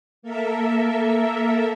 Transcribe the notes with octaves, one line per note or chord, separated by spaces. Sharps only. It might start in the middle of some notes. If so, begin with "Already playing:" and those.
A#3 A4 A#4 E5